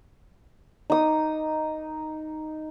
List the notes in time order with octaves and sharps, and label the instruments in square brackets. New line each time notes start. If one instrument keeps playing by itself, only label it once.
[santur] D#4 D#6